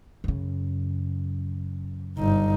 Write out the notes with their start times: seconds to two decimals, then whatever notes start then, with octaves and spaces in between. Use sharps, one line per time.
0.24 F#2 C#3
2.18 G1 D#4